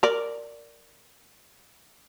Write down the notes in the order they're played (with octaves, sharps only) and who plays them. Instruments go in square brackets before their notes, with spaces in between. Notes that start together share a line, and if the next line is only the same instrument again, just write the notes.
[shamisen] A#4 D5